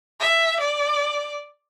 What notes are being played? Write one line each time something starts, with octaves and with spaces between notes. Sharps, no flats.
E5
D5